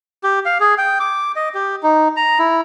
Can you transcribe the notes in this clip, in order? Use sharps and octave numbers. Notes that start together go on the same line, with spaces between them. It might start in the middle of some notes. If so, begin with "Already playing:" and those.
G4
F5
G#4
G5
D6
D#5
G4
D#4
A#5
E4